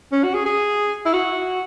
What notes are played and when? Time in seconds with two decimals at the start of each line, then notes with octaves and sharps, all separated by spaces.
0.12 C#4
0.24 F#4
0.34 G#4
0.45 G#4
1.05 E4
1.13 F#4